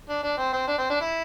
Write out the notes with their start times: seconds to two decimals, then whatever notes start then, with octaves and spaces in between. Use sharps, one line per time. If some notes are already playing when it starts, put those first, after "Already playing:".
0.10 D4
0.23 D4
0.38 C4
0.53 C4
0.68 D4
0.79 C4
0.90 D4
1.01 E4